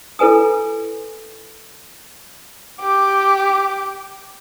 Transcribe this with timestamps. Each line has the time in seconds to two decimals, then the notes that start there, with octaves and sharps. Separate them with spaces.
0.19 E4 A4 B4 G#5 D#6
2.81 G4 D6